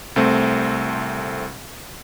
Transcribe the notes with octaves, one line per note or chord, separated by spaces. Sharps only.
C2 A3 C4